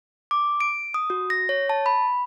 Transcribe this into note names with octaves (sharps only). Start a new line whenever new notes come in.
D6
D7
D#6
F#4
A#6
C#5
A5
B5